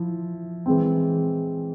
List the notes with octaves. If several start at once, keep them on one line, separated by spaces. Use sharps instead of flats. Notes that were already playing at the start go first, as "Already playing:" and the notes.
Already playing: F3 E4
E3 G#3 C4